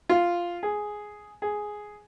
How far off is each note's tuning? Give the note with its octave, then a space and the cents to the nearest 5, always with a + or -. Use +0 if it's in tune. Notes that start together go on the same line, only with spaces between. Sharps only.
F4 -5
G#4 +5
G#4 +5